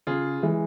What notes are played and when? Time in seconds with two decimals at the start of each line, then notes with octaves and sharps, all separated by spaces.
0.07 C#3 F4 G#4
0.43 E3 G#3